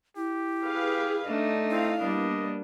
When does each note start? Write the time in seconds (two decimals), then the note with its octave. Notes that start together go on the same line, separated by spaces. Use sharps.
0.16 E4 G4
0.64 G#4 B4 F5
1.28 A3 D4 D#4
1.71 C4 E4 F5
2.00 G3 A#3 B3 D4 D#5